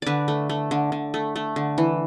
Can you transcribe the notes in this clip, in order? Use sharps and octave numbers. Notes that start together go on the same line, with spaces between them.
D3 B4 D5
A3
A3
D3
D3
A3
A3
D3
E3